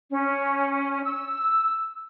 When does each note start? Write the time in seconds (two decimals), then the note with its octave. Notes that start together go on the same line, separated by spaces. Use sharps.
0.11 C#4
1.04 E6